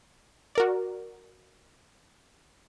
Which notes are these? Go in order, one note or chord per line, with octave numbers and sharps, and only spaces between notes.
F#4 A#4 D5